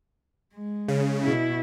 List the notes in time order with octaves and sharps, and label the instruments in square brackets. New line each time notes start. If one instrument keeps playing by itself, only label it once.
[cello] G#3
[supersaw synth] C#3
[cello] B2 E4